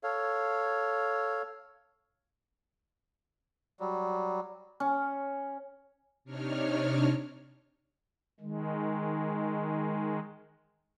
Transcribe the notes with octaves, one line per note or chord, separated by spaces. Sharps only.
A4 C#5 F5
F#3 G3
C#4
C3 D4 D#4 C#5 F6
D#3 G#3